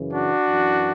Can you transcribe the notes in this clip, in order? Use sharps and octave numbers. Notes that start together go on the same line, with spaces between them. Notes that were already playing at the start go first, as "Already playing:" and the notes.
Already playing: F#2 C#3 E3
D4 F#4
F#2 E3